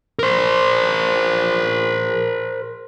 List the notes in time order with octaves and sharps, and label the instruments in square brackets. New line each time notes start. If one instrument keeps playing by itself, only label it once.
[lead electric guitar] A#4 C5